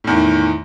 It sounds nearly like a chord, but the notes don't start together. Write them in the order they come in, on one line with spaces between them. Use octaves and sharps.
A2 E2 D#3